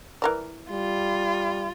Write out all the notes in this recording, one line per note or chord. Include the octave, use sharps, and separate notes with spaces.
E3 A#4 D5
G3 F4